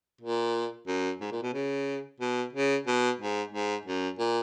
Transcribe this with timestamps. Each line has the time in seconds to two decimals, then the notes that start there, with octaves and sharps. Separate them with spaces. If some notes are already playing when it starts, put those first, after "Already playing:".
0.21 A#2
0.87 F#2
1.21 G#2
1.32 A#2
1.43 B2
1.54 C#3
2.20 B2
2.53 C#3
2.87 B2
3.19 G#2
3.52 G#2
3.86 F#2
4.19 A#2